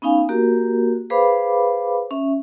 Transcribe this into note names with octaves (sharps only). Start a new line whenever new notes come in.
B3 C#4 D#4 F5 G#5
A#3 F#4 G4 A#4
G#4 B4 C5 F5 B5 D6
C#4 E5